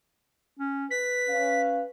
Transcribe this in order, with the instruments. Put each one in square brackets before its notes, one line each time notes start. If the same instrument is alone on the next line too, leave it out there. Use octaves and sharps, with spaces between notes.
[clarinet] C#4
[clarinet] B4 [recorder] B6
[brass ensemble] C#4 F5